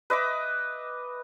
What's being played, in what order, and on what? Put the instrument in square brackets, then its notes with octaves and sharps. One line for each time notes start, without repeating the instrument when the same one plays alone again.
[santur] B4 D#5 E5 D6